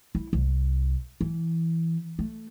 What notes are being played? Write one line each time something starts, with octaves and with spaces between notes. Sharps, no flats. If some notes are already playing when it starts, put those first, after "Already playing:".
E4
C2
E3
A3